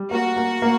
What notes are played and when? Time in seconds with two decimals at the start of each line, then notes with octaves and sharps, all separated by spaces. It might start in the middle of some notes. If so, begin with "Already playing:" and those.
Already playing: G3
0.11 A#3 F#4
0.36 A#3
0.62 A#3